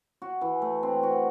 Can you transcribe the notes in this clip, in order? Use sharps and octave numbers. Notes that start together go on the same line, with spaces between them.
F#4
E3
A3
C4
F#4